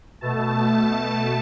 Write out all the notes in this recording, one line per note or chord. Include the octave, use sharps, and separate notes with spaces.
B2 A3 A5